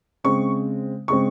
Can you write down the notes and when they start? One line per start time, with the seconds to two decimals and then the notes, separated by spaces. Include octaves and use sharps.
0.24 C#3 G#3 C4 C#6
1.08 C#3 G#3 C4 C#6